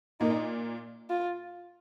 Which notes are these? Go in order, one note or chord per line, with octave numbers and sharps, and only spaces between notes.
A#2 A#3 D#4
F4